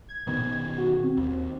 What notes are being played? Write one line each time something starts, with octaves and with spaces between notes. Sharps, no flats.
G#6
B2 D#3 B3
F#4
C4
D#2